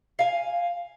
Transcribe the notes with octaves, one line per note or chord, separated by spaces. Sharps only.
F5 G#5